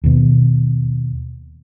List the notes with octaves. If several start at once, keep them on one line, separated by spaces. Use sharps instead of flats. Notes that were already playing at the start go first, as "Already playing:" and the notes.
D#2 B2